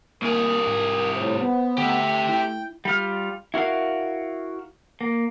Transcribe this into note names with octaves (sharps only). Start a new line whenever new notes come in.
C2 A#3 G#4 A#4
G#2
A2 C5
B3
D3 A3 G4 E5
E4 G5
G3 F4 F6
E4 F#4 A#4 F5
A#3